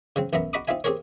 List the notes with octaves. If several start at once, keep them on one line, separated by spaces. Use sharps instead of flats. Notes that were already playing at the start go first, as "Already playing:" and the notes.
C#3 F#3 C4
B1 F#2 B3 E5 A#5
F#4 D#5 A#5 B5 D6 D#6
C4 D#4 F4 E5 G#5
C4 G4 G#4 A#4 C#5